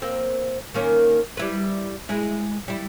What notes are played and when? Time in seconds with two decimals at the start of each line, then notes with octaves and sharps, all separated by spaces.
0.02 A#3 C4
0.74 D#3 A#3 C#4
1.37 G3 E4 B4
2.09 G#3 E4
2.68 G3 E4